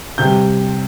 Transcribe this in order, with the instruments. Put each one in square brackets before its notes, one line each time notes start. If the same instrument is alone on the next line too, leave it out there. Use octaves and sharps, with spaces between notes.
[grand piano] C3 G3 G6